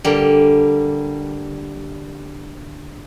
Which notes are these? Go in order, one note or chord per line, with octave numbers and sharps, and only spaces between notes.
D3 G3 A#3